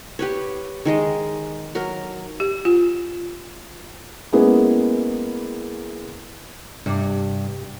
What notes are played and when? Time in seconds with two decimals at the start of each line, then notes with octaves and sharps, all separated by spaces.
0.19 G4 B4 C#5
0.85 D#3 G#3 D#5
1.75 F#3 A#4
2.40 G4
2.65 F4
4.33 G#3 A#3 B3 C#4 E4 G#4
6.86 G2 C3